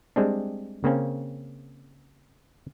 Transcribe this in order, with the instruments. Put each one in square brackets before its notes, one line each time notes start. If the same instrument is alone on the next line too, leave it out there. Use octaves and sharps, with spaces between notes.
[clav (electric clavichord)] G3 G#3 C4 D4
C#3 A#3 C4 C#4